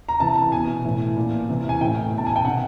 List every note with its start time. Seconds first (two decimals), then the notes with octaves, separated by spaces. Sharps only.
0.09 A#5
0.20 C3 E3 A5
0.52 B2 G#5
0.85 A2 E3
1.17 A#2
1.49 C3 E3
1.69 G#5
1.81 A2 E3 G5
2.13 B2
2.18 A5
2.27 G#5
2.36 G5
2.45 C3 D#3 F#5